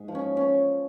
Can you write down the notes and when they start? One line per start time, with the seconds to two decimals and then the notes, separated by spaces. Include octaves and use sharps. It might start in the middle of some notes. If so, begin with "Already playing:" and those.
Already playing: G#2
0.08 F3
0.15 C#4
0.37 C#4